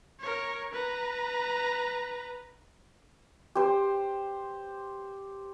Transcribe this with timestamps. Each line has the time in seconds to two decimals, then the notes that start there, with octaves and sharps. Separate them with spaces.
0.20 A#4 C#5
0.73 B4 A#5
3.55 G4 C5